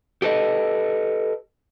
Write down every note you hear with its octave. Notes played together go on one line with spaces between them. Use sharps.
G4 A4 B4 D#5